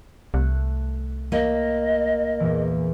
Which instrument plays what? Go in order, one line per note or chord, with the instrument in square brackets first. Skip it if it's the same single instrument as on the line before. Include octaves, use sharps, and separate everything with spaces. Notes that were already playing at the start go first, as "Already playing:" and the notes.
[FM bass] C2 [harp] A3 F#6
[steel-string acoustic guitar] A#3 [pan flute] D#5
[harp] E2 A#2 E3